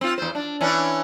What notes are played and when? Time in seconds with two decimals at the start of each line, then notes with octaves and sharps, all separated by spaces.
0.01 C4 F4
0.18 E2 C5
0.35 D4
0.61 E3 C#4 D4